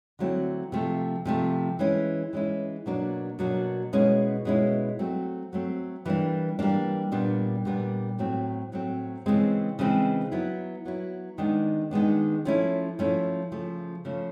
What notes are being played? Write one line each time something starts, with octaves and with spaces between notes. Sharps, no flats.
D3 F#3 A3 C4 E4
C3 F3 A3
C3 F3 A3
E3 G#3 C#4 E4
E3 G#3 C#4 E4
B2 F#3 A#3 D4
B2 F#3 A#3 D4
B2 G#3 C#4 E4
B2 G#3 C#4 E4
F#3 A3 C4
F#3 A3 C4
E3 G3 A#3 D4
E3 G3 A#3 D4
A#2 G3 B3 D4
A#2 G3 B3 D4
A2 F#3 A3 C4
A2 F#3 A3 C4
C#3 E3 G#3 C4
C#3 E3 G#3 C4
F#3 B3 E4
F#3 B3 E4
D#3 G#3 B3 D4
D#3 G#3 B3 D4
F3 A3 C#4 E4
F3 A3 C#4 E4
C#3 F3 A3
C#3 F3 A3